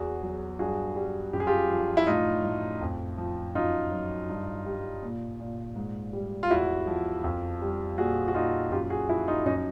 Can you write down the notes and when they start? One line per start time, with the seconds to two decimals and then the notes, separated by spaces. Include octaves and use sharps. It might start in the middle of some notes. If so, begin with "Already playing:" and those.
Already playing: E2 F#4 G#4
0.22 F#3
0.59 G2 F#4 G#4
0.96 G3
1.33 F#2 G4
1.40 G#4
1.47 F4 G4
1.70 F3
1.97 E4
2.07 A2 D#4 F4
2.44 A2
2.81 F2
3.18 F3
3.55 F#2 D#4 F4
3.92 F#3
4.29 G2
4.66 G3
5.03 A#2
5.40 A#2
5.76 G#2
6.13 G3
6.43 F4
6.50 E2 E4 F#4
6.87 F3
7.24 F2
7.62 G3
7.98 A#2 F#4 G#4
8.28 F#4
8.34 A#2 D#4 F4
8.71 F#2 F4 G4
8.90 F#4 G#4
9.09 F3 E4 F#4
9.28 D#4 F4
9.46 F#2 C#4 D#4